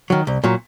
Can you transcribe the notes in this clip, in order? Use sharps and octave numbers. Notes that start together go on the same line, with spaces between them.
D#3 F#3
C2
A#2 F#3